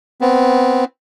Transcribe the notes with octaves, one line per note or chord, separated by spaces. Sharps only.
B3 C4